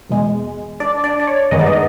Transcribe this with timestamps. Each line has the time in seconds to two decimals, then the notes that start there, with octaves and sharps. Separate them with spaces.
0.09 E2 B2 G#3
0.80 D4 D5
1.04 D4 D5
1.20 D5
1.27 C#5
1.51 G2 D#3 G#3 B3 D#4 D#5
1.59 D5
1.66 D#4 D#5